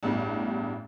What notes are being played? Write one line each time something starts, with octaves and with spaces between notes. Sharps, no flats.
A1 E2 G2